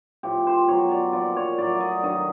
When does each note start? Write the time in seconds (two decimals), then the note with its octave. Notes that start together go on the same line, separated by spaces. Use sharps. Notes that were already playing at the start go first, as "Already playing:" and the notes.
0.23 A2 F3 G4
0.47 C5
0.68 B2 F#3 C#5
0.91 D5
1.13 A#2 F3 D5
1.36 C#5
1.58 A2 F#3 D5
1.75 D5 D#5
2.03 G2 D#3 F#3 D#5